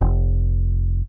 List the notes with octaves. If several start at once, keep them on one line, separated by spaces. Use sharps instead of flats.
F1